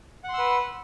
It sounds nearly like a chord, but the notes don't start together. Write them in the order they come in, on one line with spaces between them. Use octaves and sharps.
F#5 C6 E6 B4